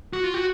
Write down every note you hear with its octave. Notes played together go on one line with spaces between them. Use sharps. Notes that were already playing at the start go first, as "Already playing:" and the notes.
F#4
F4
F#4